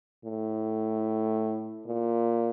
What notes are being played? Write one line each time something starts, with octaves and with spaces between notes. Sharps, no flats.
A2
A#2